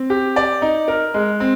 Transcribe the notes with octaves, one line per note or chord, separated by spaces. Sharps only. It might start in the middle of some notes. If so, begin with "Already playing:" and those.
Already playing: C4
G4
D5
D#4
A#4
G#3
C4